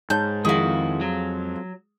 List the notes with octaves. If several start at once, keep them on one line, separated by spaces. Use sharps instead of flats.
G#2 C#5 A5 G6
F2 D#3 G#3 E4 F#4 G#4 F5
F#3